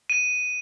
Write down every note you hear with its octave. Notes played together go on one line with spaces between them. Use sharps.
D#7